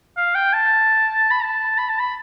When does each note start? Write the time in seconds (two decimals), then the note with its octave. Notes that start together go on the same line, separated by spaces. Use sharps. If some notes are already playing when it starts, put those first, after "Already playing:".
0.17 F5
0.35 G5
0.53 A5
1.31 B5
1.43 A5
1.78 B5
1.89 A5
2.00 B5